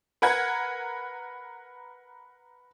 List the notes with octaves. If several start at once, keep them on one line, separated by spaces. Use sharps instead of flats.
A#4 B4 F#5 G#6